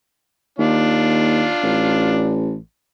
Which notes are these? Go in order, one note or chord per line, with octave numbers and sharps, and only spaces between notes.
D#2 D4 F4
A1